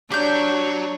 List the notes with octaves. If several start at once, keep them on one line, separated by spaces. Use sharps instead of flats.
F#3 D4 G4 C#5 C#6 G6